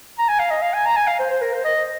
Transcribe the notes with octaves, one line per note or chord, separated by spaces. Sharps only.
A#5
G#5
F5
D#5
F5
G#5
A#5
G#5
F5
C5
C5
A#4
C5
D#5